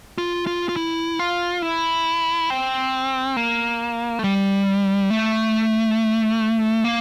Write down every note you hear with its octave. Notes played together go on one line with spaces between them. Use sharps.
F4
F4
F4
E4
F4
E4
C4
A#3
A3
G3
A3
A#3